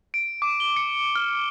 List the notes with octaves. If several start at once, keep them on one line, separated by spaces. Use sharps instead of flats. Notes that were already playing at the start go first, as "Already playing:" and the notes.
D7
D6
G7
C#7
F6